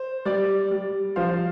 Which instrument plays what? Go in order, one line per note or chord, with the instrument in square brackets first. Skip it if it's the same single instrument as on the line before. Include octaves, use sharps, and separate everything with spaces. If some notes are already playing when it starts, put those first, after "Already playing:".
Already playing: [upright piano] C5
G3 D5
G3
F3 C5 F5